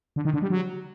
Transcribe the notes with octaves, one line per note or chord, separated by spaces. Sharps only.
D3
D#3
D3
G3
F#3